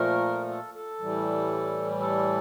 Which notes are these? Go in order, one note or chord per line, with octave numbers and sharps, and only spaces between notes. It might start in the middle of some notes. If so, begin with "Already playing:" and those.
Already playing: A#2 F3 A3 A#4
A4
A4
A2 E3 G3
A4